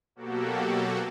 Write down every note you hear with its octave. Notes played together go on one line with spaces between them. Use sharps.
B2 F#3 A#3 F#4 G4 A4